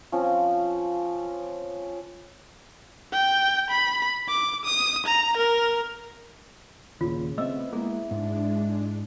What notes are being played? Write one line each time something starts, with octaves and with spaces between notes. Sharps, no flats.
F3 C4 C#4
G5
B5
D6
D#6
A#5
A#4
D#2 A#2 C#3 F4
A3 B3 C4 D#5 E5 E6
G#3 A#3 E4 G#4
G#2 G#3 D4